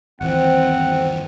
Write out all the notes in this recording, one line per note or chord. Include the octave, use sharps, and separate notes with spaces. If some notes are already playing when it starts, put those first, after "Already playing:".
G1 D#2 E3 C4 F#5